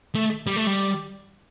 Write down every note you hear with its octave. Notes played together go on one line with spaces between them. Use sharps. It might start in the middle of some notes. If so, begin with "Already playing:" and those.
A3
G3
A3
G3